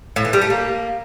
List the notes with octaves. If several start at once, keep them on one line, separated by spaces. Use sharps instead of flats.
A2
E3
G3
A3
A#3